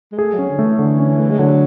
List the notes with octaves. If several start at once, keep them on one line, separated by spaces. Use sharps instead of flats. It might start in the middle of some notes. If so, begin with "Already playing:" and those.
G#3
A3 G#4
F#3
C#4
D3
A3
E3
D3
C#4
A3
G#3
D3 F#3